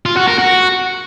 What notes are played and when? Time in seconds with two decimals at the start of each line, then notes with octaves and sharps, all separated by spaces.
0.06 F4
0.17 F#4
0.28 A#4
0.39 F#4